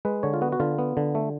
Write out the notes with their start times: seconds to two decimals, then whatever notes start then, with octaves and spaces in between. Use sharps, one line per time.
0.05 G#3 B4
0.23 D3 C#5
0.34 F4
0.42 B3 F#4
0.52 F#4
0.60 D3 F4
0.79 B3
0.97 D3
1.15 A3